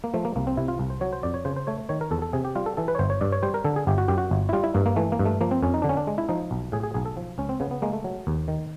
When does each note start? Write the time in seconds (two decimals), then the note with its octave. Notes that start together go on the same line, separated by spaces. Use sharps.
0.04 A#3
0.14 F3 A3
0.25 A#3
0.36 C2 A#3
0.47 C4
0.57 C3 E4
0.68 F4
0.79 C2
0.90 C5
1.01 F#3 C#5
1.13 C5
1.23 F2 D5
1.34 C#5
1.45 C#3 C5
1.56 C5
1.67 A3 C#5
1.89 D#3 C#5
2.01 A#4
2.11 E2 A4
2.22 A4
2.33 C3 G#4
2.45 G4
2.55 G3 F4
2.66 A4
2.77 E3 A4
2.88 B4
2.95 C#5
2.99 G1 C5
3.10 C#5
3.21 G2 D5
3.32 C#5
3.43 G3 C5
3.54 A#4
3.64 D3 A4
3.76 G#4
3.87 G1 G4
3.98 F#4
4.08 F#2 G4
4.18 F#4
4.31 G1
4.49 E4
4.53 G3 F4
4.64 E4
4.74 G2 A#3
4.86 A#3
4.96 E3 A3
5.12 A#3
5.19 G2
5.26 A3
5.41 F3 A#3
5.51 C4
5.63 F2 C#4
5.74 D#4
5.82 D3 D4
5.89 C#4
5.97 D4
6.07 G#3
6.18 E4
6.29 F3 D#4
6.51 B1
6.72 A2 G#4
6.83 G#4
6.94 B1 G#4
7.06 A4
7.17 F3
7.38 C#2 C#4
7.49 C4
7.60 C#3 B3
7.71 B3
7.82 G#3 A#3
7.93 A3
8.04 F#3
8.27 D#2
8.48 D#3